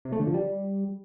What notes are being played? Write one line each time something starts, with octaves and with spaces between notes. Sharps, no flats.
C3
A3
D3
F3
G3